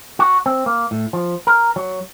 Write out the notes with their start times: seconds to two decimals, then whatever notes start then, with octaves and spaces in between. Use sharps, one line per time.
0.19 F#4
0.46 C4
0.66 A#3
0.91 A2
1.13 F3
1.47 A#4
1.76 F#3